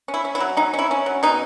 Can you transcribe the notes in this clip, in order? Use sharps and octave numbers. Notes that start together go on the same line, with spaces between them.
C#4
E4
C#4
E4
F#3
C#4 D#4
C#4
E4
C#4
F#3
B2 D#4